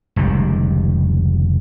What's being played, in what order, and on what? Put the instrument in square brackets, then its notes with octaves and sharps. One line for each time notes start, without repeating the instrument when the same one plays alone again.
[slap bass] F1 C#2 D#3 G3